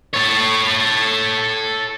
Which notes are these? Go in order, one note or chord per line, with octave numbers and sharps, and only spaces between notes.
A4 C#5